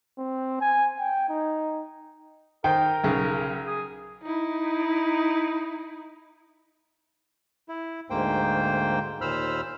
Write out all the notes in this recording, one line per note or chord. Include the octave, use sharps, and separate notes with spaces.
C4
G#5
G5
D#4
D#3 A#4 C5 G5
B1 C#3
G#4
D#4 E4
E4
D2 G#2 A#3 C5 G5
D#2 A#2 C5 B5 E6 F6